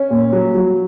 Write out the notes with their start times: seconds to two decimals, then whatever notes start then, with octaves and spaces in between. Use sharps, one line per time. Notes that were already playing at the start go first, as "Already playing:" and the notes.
Already playing: C#4
0.10 A#2
0.32 F#3
0.54 F#3